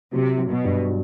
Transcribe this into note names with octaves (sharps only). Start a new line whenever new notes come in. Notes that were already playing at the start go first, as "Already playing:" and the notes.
C3 F#3
F#3
B2
G2
F#3